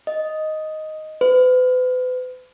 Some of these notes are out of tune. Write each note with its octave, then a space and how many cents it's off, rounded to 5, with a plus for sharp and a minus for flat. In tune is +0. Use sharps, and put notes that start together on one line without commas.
D#5 +5
B4 +40